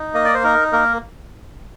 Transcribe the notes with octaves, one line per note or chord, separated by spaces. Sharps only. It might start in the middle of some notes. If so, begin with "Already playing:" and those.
Already playing: D#4
A#3 D#5
D5
C5
D#4 A#4
A#3 A#4